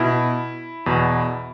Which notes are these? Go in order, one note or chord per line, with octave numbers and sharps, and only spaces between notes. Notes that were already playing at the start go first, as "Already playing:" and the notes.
Already playing: B2 E4
E2 B2